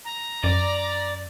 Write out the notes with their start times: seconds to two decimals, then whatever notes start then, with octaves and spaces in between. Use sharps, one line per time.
0.05 A#5
0.44 F#2 D5